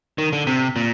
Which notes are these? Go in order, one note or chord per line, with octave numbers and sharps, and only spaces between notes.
D#3
D3
C3
A#2